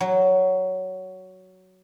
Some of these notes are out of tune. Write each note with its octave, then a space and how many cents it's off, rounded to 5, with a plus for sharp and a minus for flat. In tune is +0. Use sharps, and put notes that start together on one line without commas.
F#3 +10